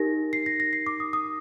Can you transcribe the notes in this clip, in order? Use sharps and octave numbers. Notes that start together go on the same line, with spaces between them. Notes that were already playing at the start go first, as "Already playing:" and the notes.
Already playing: D#4 G4 A#4 A#6
C7
A#6
A#6
C7
D6
D#6
D#6